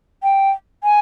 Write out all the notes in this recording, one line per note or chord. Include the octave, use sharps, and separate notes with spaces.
G5
G#5